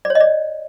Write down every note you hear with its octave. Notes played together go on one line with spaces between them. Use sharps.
D5
C#5
D#5
D5